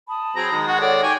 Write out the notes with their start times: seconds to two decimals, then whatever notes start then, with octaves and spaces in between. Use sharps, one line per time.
0.09 A5 B5 D#6
0.36 F#3 C4 G#4 A#5
0.52 D#3 G#3
0.67 F#4 F#5
0.81 A4 C#5 D5 F#5
1.03 G4 C#5 G5 G#5